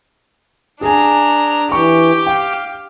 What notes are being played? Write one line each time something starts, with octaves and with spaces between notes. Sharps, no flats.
D4 G#4 G#5 A#5
E3 G4 C#6
F5 G5